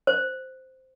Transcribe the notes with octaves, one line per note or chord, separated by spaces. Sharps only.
C5